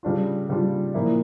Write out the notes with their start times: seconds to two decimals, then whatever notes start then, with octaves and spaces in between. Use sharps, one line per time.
0.03 C#3 G3 D4 F4
0.49 C#3 G3 D4 F4
0.94 A#2 F3 A#3 E4